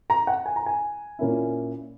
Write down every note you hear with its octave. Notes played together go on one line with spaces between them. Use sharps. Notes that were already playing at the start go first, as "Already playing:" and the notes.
A#5
F#5
G#5
A#5
G#5
A#2 A#3 C#4 E4